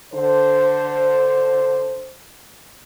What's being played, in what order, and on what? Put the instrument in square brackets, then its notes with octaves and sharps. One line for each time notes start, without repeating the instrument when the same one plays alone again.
[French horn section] D3 C5